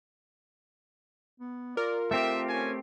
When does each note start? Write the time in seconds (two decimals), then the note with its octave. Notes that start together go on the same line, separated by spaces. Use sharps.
1.40 B3
1.77 F4 A#4 D5
2.11 A3 C4 G4 E5
2.49 C#4 G#5